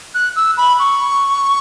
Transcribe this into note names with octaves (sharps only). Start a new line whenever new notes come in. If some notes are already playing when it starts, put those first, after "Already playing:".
F#6
E6
B5
C#6